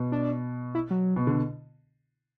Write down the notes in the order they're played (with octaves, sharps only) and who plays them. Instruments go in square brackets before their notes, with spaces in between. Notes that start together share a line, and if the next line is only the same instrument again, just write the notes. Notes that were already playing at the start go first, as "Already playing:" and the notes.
Already playing: [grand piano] B2
[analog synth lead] D4
E4
F#3
[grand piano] B2
D3